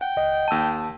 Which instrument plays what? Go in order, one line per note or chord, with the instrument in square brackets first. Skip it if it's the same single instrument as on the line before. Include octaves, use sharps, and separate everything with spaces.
[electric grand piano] F#5 [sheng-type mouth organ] G5
[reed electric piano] C#2 D#5
[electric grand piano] D#2 D#7 [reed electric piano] A5 E6